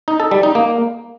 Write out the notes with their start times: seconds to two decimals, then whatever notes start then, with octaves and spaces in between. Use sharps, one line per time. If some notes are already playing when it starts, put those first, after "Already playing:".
0.08 D#4
0.20 A4
0.31 G3
0.43 D#4
0.55 A#3